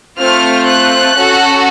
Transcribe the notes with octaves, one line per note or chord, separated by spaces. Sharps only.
A3 C4 F4 F6
F#6
C#4 F#4 A4